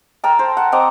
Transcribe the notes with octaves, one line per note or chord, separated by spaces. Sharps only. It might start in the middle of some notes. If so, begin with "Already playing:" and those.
A4 A#4 G5 A5
C5
F#5
C4 D#5 A#5 D6